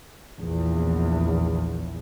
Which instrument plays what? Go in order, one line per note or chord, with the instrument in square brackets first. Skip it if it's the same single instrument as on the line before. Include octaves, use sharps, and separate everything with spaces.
[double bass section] A#1 E2